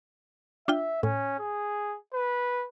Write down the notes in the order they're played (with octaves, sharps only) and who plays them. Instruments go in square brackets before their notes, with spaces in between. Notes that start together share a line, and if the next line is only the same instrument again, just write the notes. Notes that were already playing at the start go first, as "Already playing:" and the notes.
[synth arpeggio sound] D4 F4 G5 [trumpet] E5
[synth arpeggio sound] A2 [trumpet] C#4
[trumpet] G#4
B4